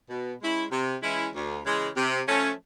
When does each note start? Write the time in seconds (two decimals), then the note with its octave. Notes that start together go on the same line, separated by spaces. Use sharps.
0.09 B2
0.41 G#3 C#4 E4
0.71 C3
1.02 E3 G#3 C#4 E4
1.34 D2
1.64 C#3 E3 G#3
1.96 C3
2.27 F3 A3 C#4